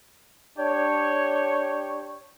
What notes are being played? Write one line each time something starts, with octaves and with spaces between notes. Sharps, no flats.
D4 G4 C#5